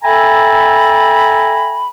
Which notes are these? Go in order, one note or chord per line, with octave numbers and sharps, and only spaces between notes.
A4 E5 G5 G#5 A#5 B5